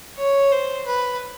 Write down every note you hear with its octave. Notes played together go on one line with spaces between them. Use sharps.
C#5
C5
B4